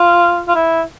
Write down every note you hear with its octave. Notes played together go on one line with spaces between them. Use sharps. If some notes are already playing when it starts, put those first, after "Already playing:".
Already playing: F4
F4
E4